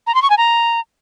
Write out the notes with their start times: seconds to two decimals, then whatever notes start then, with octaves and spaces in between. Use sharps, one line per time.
0.07 A#5
0.15 C6
0.22 C#6
0.30 G#5
0.38 A#5